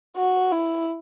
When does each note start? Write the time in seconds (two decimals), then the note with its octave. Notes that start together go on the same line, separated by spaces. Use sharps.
0.16 F#4
0.52 E4